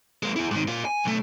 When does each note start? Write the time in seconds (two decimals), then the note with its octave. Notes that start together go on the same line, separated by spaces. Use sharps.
0.23 G#3 A#3
0.36 E4 G#4
0.51 G#2 D#3
0.68 A#3 F4
0.85 G#5
1.04 B1 A3